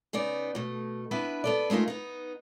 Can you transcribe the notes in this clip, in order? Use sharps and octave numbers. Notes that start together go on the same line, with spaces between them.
C#3 B3 D#4 D5
B2 A3
B3 D4 E4 B4 E5
B3 A4 D5
G#3 A3 D#4 F4 A#4
B3 D#4